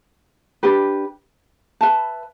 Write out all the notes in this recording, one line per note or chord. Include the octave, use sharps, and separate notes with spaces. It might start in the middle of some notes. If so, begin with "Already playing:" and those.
D4 G4 B4
B4 E5 A5